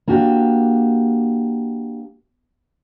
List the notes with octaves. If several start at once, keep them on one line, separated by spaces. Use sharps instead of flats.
A#3 D4 F#4 G4